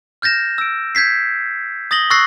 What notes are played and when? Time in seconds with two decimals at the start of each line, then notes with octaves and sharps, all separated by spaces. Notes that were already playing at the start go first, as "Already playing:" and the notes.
0.22 F6 G6 A6 A#6 E7
0.58 E6 D7
0.95 G6 G#6 B6 C7
1.91 D#6 A6 A#6 F#7 G7
2.10 C#6 E6 F#6 A6 A#6 C7